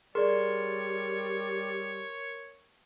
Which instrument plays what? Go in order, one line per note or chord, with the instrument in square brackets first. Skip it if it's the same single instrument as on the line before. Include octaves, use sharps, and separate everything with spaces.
[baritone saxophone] G3 [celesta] G#4 D5 [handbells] A#4 C6 [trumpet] C#5